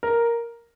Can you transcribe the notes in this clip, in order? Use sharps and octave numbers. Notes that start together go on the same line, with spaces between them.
A#4